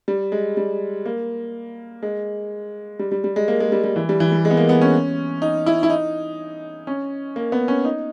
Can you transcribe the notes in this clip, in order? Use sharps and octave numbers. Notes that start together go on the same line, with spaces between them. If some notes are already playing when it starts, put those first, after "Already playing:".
G3
G#3
G3
A#3
G#3
G3
G3
G3
G#3
A#3
G#3
G3
G3
E3
G3
E3
G3
G#3
B3
A#3
B3
C#4
D#4
E4
E4
D#4
C#4
A#3
B3
C#4
D#4